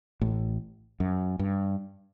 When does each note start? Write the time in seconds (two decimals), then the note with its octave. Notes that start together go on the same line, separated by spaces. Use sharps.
0.21 A1 A2
1.00 F#2
1.39 G2